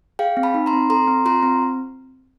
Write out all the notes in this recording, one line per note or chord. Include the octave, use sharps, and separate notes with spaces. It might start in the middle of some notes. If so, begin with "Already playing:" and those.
G#4 F5 G5
C4
A5 B5
D#4
A#5 C6
C4
A4 A#5 C6
C4
F4 A#5 C6
C4